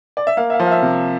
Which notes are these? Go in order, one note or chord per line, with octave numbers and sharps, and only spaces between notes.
D5
E5
A#3 F5
E5
F5
F3
F5
E5
C3